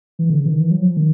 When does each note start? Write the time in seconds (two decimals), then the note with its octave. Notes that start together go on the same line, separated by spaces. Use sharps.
0.19 E3
0.30 D3
0.39 C#3
0.46 E3
0.50 D#3
0.61 E3
0.71 F#3
0.81 F3
0.97 D#3